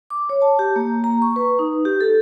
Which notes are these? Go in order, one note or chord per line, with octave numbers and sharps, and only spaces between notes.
D6
C#5
A5
G4
A#3
A#5
C#6
B4
D#4
G4
A4